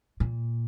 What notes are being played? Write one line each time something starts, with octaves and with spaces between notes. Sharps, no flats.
A#2